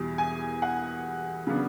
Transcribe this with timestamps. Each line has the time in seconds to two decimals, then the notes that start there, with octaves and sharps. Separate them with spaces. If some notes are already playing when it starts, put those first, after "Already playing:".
Already playing: E2 B2 G3
0.18 G#5
0.62 F#5
1.47 C#3 F#3 B3 D4